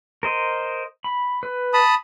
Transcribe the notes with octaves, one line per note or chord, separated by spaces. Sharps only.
A#4 C5 D#5
B5
B4
A5 B5 D#6